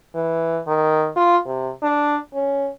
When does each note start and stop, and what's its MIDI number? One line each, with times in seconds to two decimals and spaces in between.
0.15 0.60 52
0.67 1.09 51
1.16 1.37 65
1.46 1.71 48
1.82 2.17 62
2.34 2.69 61